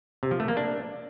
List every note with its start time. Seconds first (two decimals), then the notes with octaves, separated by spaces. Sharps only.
0.23 C3
0.31 F3
0.40 A3
0.48 A#3
0.57 D4